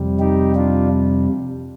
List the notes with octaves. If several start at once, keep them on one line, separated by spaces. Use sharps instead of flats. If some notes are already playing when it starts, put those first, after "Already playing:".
Already playing: F2 C3 G3
D#4 G4
D4 F4